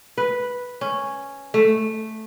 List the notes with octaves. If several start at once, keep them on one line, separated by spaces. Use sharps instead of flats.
B4
C#4
A3